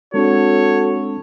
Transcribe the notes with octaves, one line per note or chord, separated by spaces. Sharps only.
G#3 C4 D4 F#4 A4 C#5